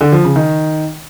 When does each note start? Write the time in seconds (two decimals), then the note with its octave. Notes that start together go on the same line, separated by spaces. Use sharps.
0.01 D3
0.12 F3
0.24 C#3
0.36 D#3